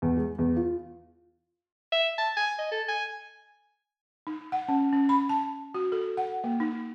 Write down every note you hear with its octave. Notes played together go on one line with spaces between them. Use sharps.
E2
G#3
E2
F4
E5
A5
G#5
D#5
A4
G#5
D#4
F#5
C#4
C#4
B5
A5
F#4
A4
F#5
A#3
D#4